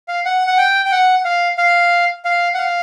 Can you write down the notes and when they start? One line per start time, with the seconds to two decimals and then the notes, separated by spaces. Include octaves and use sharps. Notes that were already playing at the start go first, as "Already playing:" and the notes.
0.08 F5
0.25 F#5
0.47 F#5
0.58 G5
0.86 G5
0.92 F#5
1.25 F5
1.58 F5
2.25 F5
2.54 F#5
2.58 F5